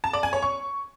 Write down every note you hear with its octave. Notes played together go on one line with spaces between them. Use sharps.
A5
D5
G#5
C#5
C#6